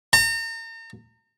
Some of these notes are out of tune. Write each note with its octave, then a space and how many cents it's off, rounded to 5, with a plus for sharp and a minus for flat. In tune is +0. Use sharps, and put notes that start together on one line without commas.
A#5 -40